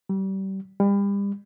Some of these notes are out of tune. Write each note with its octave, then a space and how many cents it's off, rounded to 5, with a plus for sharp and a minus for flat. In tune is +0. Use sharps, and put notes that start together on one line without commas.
G3 -30
G3 +35